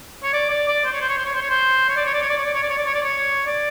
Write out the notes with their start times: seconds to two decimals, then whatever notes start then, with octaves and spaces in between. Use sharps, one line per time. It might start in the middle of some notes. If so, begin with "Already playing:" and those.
0.23 C#5
0.33 D5
0.50 D5
0.67 D5
0.84 C5
0.93 C#5
1.00 C5
1.09 C#5
1.17 C5
1.25 C#5
1.34 C5
1.41 C#5
1.50 C5
1.89 C#5
1.96 D5
2.05 C#5
2.13 D5
2.21 C#5
2.29 D5
2.37 C#5
2.45 D5
2.54 C#5
2.62 D5
2.70 C#5
2.77 D5
2.86 C#5
2.94 D5
3.02 C#5
3.46 D5